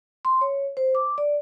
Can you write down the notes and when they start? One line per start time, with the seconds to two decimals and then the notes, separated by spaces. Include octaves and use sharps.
0.25 C6
0.41 C#5
0.77 C5
0.95 D6
1.18 D5